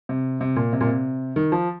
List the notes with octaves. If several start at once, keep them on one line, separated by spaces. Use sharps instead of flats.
C3
C3
A#2
C3
A#2
C3
D#3
F3